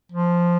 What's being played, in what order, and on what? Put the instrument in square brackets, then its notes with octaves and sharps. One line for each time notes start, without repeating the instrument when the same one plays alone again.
[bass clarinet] F3